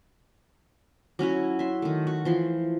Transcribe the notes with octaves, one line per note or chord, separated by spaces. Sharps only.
F#3 C#4 E4 F#4
E5 C6
D#3 A3
F#4
E3 F3 C6